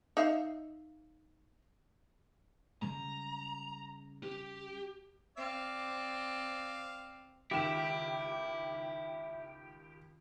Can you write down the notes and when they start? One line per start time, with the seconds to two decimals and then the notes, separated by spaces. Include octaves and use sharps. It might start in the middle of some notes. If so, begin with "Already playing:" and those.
0.17 D#4 E5 F5
2.82 C#3 G3 G#3 A#5
4.23 G4
5.37 C4 D5 F5
7.51 C#2 D#3 E4 G4 E7